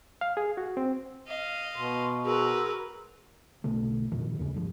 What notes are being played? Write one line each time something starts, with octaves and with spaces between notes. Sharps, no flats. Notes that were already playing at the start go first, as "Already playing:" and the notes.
F5
G#4
F#4
C4
D#5 F5
B2 C6
F#4 G#4 A#4 B4 C6 E6
B1 B2 D3 A3
F2 A#2 D3 D#3
D#2 C#3
G1 C#3 F3